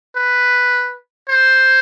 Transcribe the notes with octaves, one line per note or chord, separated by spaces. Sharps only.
B4
C5